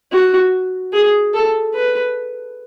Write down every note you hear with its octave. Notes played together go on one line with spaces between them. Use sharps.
F#4
G#4
A4
B4